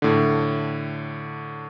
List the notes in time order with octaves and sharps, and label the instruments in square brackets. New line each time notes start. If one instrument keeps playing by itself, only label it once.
[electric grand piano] A2 D3